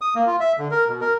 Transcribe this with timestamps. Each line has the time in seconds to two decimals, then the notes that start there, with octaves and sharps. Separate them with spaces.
0.01 D#6
0.15 A#3
0.27 F4
0.40 E5
0.59 D3
0.71 A#4
0.88 B2
1.01 A#4